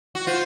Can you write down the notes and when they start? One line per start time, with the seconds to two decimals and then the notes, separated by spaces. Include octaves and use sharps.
0.15 F#4
0.27 F4 C5